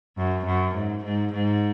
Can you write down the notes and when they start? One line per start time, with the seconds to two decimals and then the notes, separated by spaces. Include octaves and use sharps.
0.17 F#2
0.46 F#2
0.75 G#2
1.04 G#2
1.33 G#2